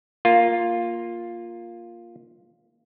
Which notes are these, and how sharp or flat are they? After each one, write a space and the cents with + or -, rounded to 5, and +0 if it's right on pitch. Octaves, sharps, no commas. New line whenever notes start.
A#3 +0 F4 +0